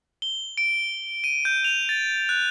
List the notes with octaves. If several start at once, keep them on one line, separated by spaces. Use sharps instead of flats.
G7
D7
D#7
G6
F7
A6
F#6